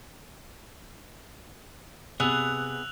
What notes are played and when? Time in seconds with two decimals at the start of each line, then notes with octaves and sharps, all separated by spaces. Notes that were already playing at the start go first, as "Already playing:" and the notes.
2.20 C3 B3 G#4 E6 F#6 F7